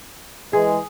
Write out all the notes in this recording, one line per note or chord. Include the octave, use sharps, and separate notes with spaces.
E3 G#3 G#4